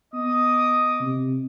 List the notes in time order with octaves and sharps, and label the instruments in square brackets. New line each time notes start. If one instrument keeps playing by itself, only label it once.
[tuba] B3 [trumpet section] D#5 D6 D#6
[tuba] C3